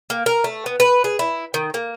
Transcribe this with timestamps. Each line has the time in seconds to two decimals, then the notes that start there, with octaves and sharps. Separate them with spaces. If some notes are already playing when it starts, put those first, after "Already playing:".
0.10 A#3
0.26 A#4
0.44 A3
0.66 B3
0.80 B4
1.04 G#4
1.19 E4
1.54 D#3
1.74 A#3